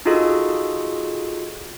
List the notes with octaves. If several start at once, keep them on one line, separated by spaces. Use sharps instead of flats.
D#4 F4 F#4 G#4 A4 D#5